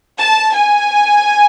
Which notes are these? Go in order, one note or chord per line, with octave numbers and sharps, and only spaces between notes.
A5
G#5